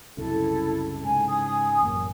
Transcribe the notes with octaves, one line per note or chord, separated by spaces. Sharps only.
C2 F#2 C#3 E4 A4
G#2 C#3 G#5
G#5 D#6
A1 F#2 A#3